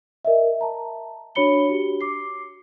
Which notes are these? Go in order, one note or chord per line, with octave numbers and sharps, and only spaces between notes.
A#4 D#5 E5
A5 A#5
D4 F#4 C#5 B5 C#7 G7
F#4 G4
D6 C7